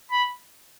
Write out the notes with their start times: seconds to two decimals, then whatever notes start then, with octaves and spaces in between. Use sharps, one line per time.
0.11 B5